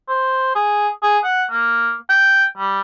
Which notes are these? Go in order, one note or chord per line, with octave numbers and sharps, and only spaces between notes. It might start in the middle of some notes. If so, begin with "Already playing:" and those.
C5
G#4
G#4
F#5
A#3
G5
G3